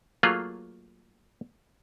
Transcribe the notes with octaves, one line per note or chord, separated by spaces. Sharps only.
F#3 A3 A#3 F4 G#4